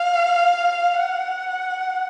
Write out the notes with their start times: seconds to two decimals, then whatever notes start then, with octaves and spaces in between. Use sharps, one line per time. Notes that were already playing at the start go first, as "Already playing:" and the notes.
Already playing: F5
0.94 F#5